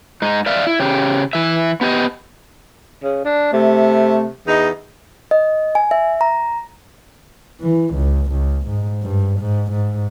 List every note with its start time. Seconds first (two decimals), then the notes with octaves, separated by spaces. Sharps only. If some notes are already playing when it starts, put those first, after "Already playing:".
0.22 G#2 D#4
0.46 D5 E5 F5
0.67 E4
0.80 C#3 G4
1.33 E3 E5
1.81 B3 G4 D#5
3.03 C#3
3.25 D4
3.53 C3 A3
4.47 E2 D#4
5.31 D#5
5.75 G#5
5.91 E5
6.21 A#5
7.61 E3
7.95 C#2
8.31 C#2
8.67 G#2
9.02 G2
9.40 G#2
9.71 G#2